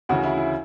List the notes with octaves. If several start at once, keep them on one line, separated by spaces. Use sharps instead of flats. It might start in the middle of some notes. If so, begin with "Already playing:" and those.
D2 C#3 E3 F#4
E4
E4